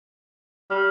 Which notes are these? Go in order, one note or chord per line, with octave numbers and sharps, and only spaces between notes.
G3 F6